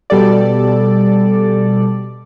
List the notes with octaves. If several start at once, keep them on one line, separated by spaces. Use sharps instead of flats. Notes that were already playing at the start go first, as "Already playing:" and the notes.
B2 G3 A4 D5